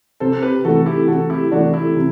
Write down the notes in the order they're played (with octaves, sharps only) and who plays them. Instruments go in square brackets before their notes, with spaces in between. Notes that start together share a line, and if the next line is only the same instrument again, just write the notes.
[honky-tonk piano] C3 [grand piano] A4 C5
[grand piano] G4 B4
[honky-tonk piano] E3 A3 [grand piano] F#4 A4
[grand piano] E4 G4
[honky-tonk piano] C3 [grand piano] F#4 A4
[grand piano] E4 G4
[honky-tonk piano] E3 A3 [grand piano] D4 F#4
[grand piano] E4 G4
[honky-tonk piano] C3